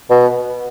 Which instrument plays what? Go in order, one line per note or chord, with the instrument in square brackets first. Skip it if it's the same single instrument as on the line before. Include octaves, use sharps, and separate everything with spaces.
[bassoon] B2